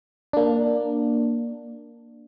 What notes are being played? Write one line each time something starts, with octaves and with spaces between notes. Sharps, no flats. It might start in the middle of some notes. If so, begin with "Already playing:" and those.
A#3 D4